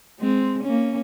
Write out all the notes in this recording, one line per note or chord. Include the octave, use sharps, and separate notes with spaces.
G#3 C4
A#3 C#4